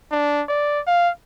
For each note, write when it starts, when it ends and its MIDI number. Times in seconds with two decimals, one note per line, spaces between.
0.11 0.43 62
0.48 0.80 74
0.87 1.10 77